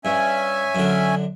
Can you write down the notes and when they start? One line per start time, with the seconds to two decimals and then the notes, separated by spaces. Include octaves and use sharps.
0.05 G2 C#4 E5 G#5
0.75 F#2 D3